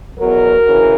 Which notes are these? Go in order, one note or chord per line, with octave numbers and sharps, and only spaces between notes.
E2 B2 F#3 F#4 A#4
D2 C#3 E3